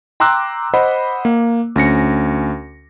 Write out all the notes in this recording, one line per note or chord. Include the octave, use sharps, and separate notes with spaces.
G5 A#5 C6 D6 E6 F#6
C5 D#5 F#5 B5
A#3
D2 C#4 A#6 C#7